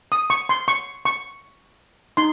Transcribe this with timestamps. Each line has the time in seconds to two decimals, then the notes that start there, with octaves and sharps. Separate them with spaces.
0.12 D#6
0.30 C#6
0.49 C6
0.68 C#6
1.05 C#6
2.17 D#4 C6